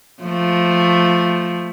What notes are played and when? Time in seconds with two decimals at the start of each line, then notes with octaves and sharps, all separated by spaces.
0.22 F3 A3